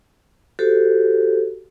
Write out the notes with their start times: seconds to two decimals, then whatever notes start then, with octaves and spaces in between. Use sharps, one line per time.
0.59 F#4 G4 A4 C5